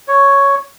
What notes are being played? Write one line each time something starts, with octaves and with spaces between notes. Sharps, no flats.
C#5